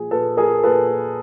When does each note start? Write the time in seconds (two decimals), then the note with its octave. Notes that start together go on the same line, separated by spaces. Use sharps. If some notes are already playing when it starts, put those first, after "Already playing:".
Already playing: A#2 F3 G#4
0.11 A#2 A4 B4
0.37 F3 G#4 A#4
0.63 A#2 A4 B4